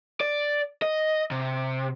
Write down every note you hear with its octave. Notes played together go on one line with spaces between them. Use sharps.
D5
D#5
C3